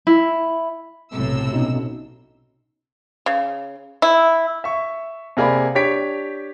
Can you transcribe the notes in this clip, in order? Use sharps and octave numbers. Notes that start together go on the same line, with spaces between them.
E4
B1 A2 C3 E6
B2 C#4 D#4
C#3
E4
E5 C#6
C3 A#3 G#4 D5 B5
D4 G4 C#5 B6 D7